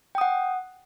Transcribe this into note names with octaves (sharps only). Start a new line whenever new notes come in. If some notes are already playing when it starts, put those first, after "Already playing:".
F#5 G5 D#6